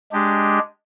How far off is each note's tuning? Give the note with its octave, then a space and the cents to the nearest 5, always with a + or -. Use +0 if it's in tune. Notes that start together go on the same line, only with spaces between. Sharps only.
G#3 +0 D4 +0 G4 +0